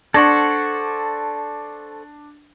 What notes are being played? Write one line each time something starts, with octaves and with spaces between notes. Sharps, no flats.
D4 A4 C5 F#5 C#6 G#6 A#6